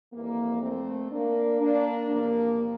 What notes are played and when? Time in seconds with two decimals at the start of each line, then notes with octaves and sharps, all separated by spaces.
0.13 F2 E3 G3 A#3
0.63 A3 C4
1.11 A#3 D4
1.60 A#3 D4
2.09 E2 C3 F3 A#3